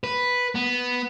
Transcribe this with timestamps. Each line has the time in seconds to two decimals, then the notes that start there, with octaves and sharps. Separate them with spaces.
0.04 B4
0.55 B3